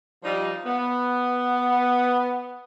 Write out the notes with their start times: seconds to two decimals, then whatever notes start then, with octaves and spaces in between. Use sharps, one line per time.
0.24 F3 G3 D#4
0.66 B3